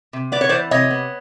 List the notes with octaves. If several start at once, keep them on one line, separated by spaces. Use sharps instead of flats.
C3
B3 D5
C#5
E3 C5 D5
C3 C#5 D#5
B3